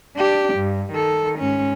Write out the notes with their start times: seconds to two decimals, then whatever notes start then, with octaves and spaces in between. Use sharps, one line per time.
0.16 D4 G4
0.54 G2
0.93 D#3 A4
1.39 G#2 C#4